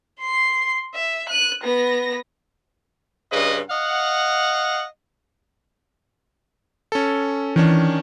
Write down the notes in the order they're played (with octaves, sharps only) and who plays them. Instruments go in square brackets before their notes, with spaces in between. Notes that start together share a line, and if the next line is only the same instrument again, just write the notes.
[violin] C6 C7
E5
F#6 D#7
B3 A#6
[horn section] G2 C#3 B4 D#5
D#5 F5 F#5
[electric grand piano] C#4 A4
[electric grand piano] D#3 C#4 D4 [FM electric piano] E3